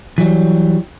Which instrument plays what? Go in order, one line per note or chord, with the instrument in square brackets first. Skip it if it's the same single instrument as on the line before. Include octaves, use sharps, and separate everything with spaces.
[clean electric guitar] E3 F#3 G3